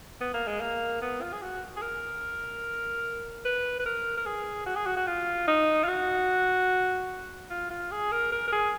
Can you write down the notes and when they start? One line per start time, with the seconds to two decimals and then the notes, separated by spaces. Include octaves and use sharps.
0.21 B3
0.34 A#3
0.47 G#3
0.61 A#3
1.02 B3
1.22 F4
1.33 G#4
1.43 F#4
1.77 G#4
1.82 A#4
3.45 B4
3.80 B4
3.86 A#4
4.17 A#4
4.26 G#4
4.66 F#4
4.76 G#4
4.86 F#4
4.97 F#4
5.07 F4
5.48 D#4
5.84 F4
5.88 F#4
7.50 F4
7.70 F4
7.91 G#4
8.12 A#4
8.32 A#4
8.48 A#4
8.52 G#4